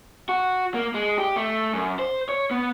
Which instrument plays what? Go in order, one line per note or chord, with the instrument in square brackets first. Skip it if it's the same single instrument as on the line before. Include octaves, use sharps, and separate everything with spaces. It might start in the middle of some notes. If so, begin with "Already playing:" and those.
[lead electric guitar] F#4
A#3
G#3
G4
A3
F#2
C5
C#5
B3